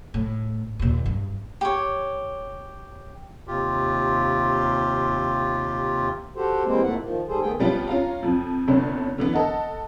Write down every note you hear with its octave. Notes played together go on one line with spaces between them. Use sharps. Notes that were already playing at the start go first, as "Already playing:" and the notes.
A2
D#2 A#2
G2
G4 C#5
D#2 C3 F4 G4
F#4 G4 A4 C5
E3 G3 G#3 A#3 C4 C5
F2 A2 A3 A#3 F#5
D#3 F3
G#2 G3 G#4 A4 C5
D#3 A3 B3 G#4 G5
F3 G3 B3 C#4 F4
C#4 F4 F5 A#5
F2 F3
G1 C2 B3 C#4 D4
D3 E3 B3
A4 D#5 F#5